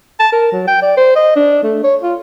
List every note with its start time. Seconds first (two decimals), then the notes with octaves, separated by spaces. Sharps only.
0.20 A5
0.32 A#4
0.52 F#3
0.68 G5
0.82 D5
0.97 C5
1.16 D#5
1.36 D4
1.63 A3
1.84 C#5
2.03 F4